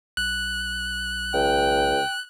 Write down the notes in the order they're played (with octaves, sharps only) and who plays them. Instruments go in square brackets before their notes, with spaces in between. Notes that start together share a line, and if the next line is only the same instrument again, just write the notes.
[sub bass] B1 [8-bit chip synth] F#6
[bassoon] C#2 [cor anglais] G5